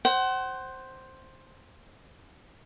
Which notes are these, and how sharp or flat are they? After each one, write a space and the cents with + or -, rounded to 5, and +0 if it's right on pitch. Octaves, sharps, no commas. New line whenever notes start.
C5 +10 F#5 +35